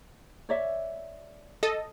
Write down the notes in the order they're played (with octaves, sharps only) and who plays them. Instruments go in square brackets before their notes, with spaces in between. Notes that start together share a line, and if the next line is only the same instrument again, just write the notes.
[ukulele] C#5 D5 E5
[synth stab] A4 D#5